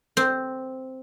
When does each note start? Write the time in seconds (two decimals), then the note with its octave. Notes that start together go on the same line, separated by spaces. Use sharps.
0.17 C4